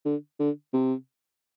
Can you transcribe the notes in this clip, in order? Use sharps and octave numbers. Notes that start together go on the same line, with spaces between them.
D3
D3
C3